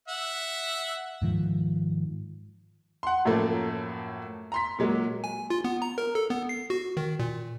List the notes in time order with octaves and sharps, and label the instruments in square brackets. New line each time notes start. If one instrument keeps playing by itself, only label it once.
[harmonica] E5 F#5
[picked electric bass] G#2 D#3 F3
[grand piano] F#5 C6
F#2 A2 F3 A3 A#3
A#5 C6 B6
A#2 F#3 G#3 A#3
[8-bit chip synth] G#5
F4
B3
A#5
A#4
A4
B3
C7
F#4
D#3
A#2